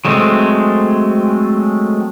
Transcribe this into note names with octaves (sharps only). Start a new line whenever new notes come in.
F#3 G#3 A3 C4